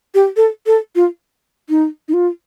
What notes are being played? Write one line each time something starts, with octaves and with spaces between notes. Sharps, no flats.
G4
A4
A4
F4
D#4
D#4
F4